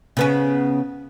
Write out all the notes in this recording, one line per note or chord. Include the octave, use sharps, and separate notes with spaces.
C#3 B3 C#4